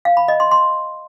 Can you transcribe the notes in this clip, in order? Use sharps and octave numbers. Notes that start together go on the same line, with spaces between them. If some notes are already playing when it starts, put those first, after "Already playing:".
F5
B5
D#5
C6
C6